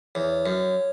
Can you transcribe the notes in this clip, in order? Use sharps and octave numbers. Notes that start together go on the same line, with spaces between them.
E2 C#5
F#2